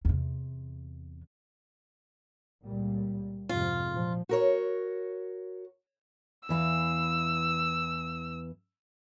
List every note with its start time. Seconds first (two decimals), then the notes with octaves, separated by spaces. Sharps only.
0.05 E2 C3
2.64 C#2 A#2 G3
3.49 F2 G#2 C3 F4
3.92 A#2 F3
4.29 F#4 A#4 C#5
6.49 E2 E3 F5 E6